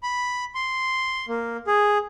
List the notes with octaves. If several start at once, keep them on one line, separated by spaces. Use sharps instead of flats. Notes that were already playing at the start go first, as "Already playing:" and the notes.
B5
C6
A#3
G#4